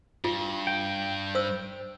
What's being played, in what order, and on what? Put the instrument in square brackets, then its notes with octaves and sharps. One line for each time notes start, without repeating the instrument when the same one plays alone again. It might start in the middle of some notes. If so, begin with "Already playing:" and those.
[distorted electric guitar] G2 [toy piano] F4
[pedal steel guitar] G5
[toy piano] C5 E6